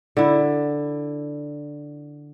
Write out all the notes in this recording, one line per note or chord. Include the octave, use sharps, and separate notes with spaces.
D3 E4